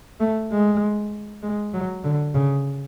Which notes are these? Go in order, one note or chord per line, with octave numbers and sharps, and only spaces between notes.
A3
G#3
G#3
F#3
D3
C#3